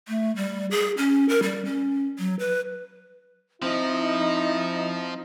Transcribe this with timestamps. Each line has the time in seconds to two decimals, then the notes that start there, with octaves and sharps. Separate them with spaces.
0.08 A3
0.36 G3
0.71 G#4
0.97 C#4
1.29 A#4
1.43 G3
1.65 C#4
2.19 F#3
2.39 B4
3.62 F3 C4 D#4 E4